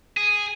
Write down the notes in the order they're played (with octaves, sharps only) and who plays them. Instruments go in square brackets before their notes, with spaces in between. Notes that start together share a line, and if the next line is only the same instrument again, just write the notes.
[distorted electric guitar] G#4